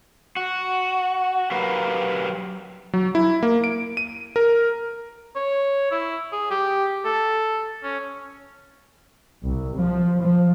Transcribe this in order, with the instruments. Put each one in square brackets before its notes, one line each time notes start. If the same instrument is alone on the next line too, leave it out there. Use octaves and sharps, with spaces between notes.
[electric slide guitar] F#4
F#3 G4 A#4 B4 F5
[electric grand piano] F#3
E4
A#3
D7
D#7
A#4
[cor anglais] C#5
E4
G#4
G4
A4
C#4
[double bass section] C2
F3
F3